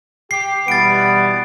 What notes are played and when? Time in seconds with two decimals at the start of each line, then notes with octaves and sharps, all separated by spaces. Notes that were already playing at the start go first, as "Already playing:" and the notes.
0.31 G4 C7
0.68 B2 E3 G3 B3 A6 D7